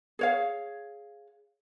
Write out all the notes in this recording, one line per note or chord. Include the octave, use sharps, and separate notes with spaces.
G#4 C#5 F5